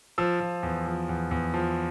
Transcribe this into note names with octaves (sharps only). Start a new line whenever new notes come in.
F3 E6
F3
E2
F3
E2
E2
F3